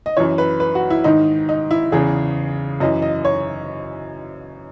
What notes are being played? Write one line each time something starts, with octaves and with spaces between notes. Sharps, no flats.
D#5
F#2 E3 C#5
B4
B4
F#4
E4
G#2 D#3 D#4
D#4
E4
E2 C#3 E3 G#4
F#2 E3 D#5
D#5
C#5